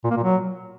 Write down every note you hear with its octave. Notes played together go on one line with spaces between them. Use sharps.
A#2
A#3
A#2
F#3